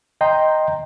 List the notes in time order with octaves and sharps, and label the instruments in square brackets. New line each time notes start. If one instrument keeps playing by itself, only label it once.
[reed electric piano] D#5 G5 A#5 C6